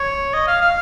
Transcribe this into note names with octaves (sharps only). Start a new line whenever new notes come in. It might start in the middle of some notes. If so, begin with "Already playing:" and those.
Already playing: C#5
D#5
F5
F5